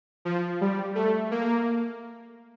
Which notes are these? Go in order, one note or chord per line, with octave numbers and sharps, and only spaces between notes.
F3
G3
A3
A#3